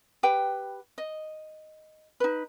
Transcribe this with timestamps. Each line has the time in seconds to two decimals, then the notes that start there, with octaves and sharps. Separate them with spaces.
0.23 G4 B4 G5
0.98 D#5
2.20 D#4 B4